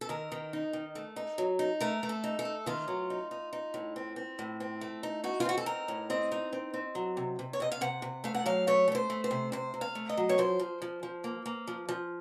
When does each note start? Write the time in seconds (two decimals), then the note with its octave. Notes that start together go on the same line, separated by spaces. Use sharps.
0.01 A4
0.09 D#3 A#4
0.32 D#3
0.53 D#4
0.73 D#3
0.95 A3
1.16 D#4
1.38 F#3
1.59 D#4
1.81 A3 A#4
2.03 A3
2.09 A4
2.24 D#4
2.39 A4
2.45 A3
2.66 D#3 F4
2.88 F#3
3.10 D#4
3.31 D#4
3.53 D#4
3.74 A2
3.96 C4
4.16 C4
4.39 A2
4.60 C4
4.81 A3
5.03 D#4
5.24 D#4 F#4
5.40 F4
5.45 C4 F#4
5.58 A4
5.66 D#4 A#4
5.88 A2
6.10 C4 D#5
6.32 D#4
6.53 C4
6.74 C4
6.95 F#3
7.17 C3
7.39 C3
7.53 C#5
7.60 C3 D#5
7.72 F5
7.81 C3 F#5
8.02 C3
8.24 A3 F5
8.35 F#5
8.46 F#3 F5
8.67 A3 C#5
8.88 A3 C#5
8.95 C5
9.10 A3
9.24 C5
9.31 C3
9.52 C3 C5
9.74 C3
9.81 F5
9.95 A3
10.09 D#5
10.17 F#3
10.29 C#5
10.38 F3 C5
10.60 F3
10.82 F3
11.03 F3
11.24 A#3
11.46 A#3
11.67 F3
11.89 F3